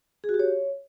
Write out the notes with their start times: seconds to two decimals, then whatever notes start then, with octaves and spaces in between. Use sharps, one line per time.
0.24 G#4
0.29 F#4
0.34 G4
0.39 C#5